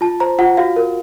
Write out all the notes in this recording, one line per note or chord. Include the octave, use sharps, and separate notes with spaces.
F4 A5
C5 A#5
F4 F#5
F#4 F5
A#4